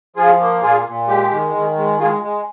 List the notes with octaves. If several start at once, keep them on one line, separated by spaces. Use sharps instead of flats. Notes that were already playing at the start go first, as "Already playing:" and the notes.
F3 F4 G#4
A#3
A#2 F4 G#4
A#2
G#3 G4
D#3
D#3
G#3
G#3 F4 G#4
G#3